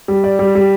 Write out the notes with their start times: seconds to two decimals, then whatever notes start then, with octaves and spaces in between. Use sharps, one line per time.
0.08 G3
0.24 D5
0.39 G3
0.55 G3